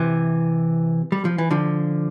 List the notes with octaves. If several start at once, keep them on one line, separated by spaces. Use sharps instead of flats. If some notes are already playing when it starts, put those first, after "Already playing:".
Already playing: C3 E3
G3
F3
E3
D3 F3